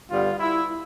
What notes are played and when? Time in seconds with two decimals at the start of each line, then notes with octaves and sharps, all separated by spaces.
0.10 G2 D3 G3 B3 F4
0.39 E4